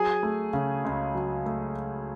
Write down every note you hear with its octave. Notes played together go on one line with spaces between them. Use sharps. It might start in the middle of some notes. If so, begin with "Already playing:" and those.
Already playing: F#3 G#4 G#5
A3
C#3
C#2
F#3
A3